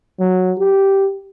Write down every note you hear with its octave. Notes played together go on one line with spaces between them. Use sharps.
F#3
G4